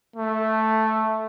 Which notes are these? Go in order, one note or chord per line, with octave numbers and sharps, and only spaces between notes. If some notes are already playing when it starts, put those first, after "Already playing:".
A3